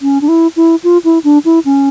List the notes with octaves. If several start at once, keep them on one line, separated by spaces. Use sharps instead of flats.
C#4
D4
E4
E4
F4
E4
D4
E4
C#4